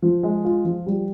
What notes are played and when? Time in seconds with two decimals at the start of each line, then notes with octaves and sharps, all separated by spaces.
0.02 F3
0.23 G#3
0.45 F4
0.65 F3
0.87 G3